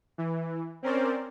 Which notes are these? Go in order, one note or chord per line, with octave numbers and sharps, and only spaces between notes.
E3
C4 C#4 A#4 C5 D5